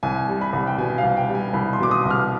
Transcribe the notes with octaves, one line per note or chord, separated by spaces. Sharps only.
C2 G#5
G3
B5
C2
G5
B2 G#5
F5
C2
G5
G3
G#5
C2 B5
C6
B2 D6
D#6
C2
F6